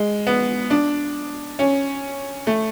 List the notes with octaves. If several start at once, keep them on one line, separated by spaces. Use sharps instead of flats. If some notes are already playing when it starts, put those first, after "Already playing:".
Already playing: G#3
B3
D4
C#4
A3